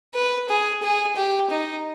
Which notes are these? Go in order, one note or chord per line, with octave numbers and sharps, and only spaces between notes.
B4
G#4
G#4
G4
D#4